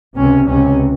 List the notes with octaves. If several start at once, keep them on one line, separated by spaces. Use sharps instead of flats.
C#2 C3 C#4
C#2 C3 C#4